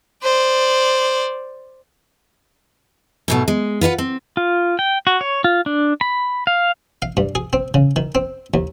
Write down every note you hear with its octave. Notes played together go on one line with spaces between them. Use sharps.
C5 D5
G#2 B2 A3
G#3
F4 B4 F5 F#5
C4
F4
G5
F#4
C#5
F4
D4
B5
F5
F5
G2
G#4
C4
C#3
D#3
C4
D#2